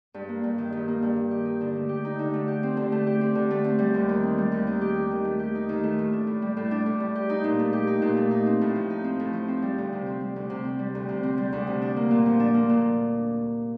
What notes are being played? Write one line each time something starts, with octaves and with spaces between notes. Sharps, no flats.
G2
A#3
G2
D#3
G2
A#3
G2
D#3
G4
D#4
D3
A3
G4
D#4
D3
A3
G4
C4
D3
A3
G4
C4
D3
A3
C4
G3
D#2
D#3
C4
G3
D#2
D#3
G4
D#4
D#3
A3
G4
D#4
D#3
A3
A2
D4
A2
G3
A2
D4
A2
G3
G4
D#4
A#2
A3
G4
D#4
A#2
A3
D#4
C4
A2
F3
D#4
C4
A2
F3
C4
G3
D2
C3
C4
G3
D2
C3
C4
G3
D2
C3
C4
G3
D2
C3
D4
A#3
A#2
F3
D4
A#3
A#2